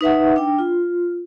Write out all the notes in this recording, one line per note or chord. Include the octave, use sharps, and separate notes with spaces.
D#4 B4 E5 F#5
D4 G5
F4